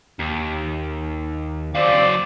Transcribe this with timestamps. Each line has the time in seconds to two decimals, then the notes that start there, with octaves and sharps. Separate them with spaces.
0.19 D#2
1.75 F#3 C4 D5 F5